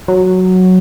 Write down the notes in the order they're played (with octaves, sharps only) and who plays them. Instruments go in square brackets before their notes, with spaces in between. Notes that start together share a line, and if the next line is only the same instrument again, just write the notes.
[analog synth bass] F#3